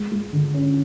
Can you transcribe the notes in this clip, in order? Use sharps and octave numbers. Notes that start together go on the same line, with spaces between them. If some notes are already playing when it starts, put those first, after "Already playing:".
Already playing: G#3
G#3
D3
C#4